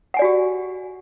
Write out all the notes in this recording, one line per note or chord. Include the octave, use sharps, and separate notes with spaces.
F#4 G4 D5 F#5 G#5